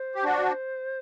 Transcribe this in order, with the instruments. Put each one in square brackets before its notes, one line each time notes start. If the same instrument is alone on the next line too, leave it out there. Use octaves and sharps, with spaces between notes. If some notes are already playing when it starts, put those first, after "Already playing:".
Already playing: [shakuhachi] C5
[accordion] G4
D4 F#4